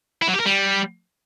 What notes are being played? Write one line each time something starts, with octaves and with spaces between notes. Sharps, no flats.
E4
F#3
G4
A#4
G3